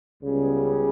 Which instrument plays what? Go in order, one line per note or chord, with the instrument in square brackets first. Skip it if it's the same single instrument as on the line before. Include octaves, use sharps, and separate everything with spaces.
[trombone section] C#2 C#3 G3 B3